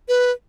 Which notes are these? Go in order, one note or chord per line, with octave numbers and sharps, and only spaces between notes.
B4